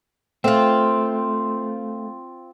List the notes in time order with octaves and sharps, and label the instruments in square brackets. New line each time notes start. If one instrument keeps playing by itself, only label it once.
[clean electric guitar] A3 [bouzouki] C4 F4